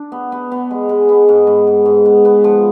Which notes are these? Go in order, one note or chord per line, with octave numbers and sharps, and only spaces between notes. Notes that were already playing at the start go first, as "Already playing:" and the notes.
Already playing: D4
B3
B3
B3
G#3
G#3
B3
G#2
G#2
G#2
G#2
B3
B3
F3